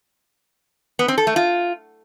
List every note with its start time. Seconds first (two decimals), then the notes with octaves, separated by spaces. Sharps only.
0.99 B3
1.08 C4
1.18 A4
1.27 A3
1.36 F4